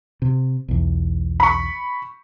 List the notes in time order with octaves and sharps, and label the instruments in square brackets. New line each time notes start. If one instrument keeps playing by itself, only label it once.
[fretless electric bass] C3
B1 E2
[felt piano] B5 C#6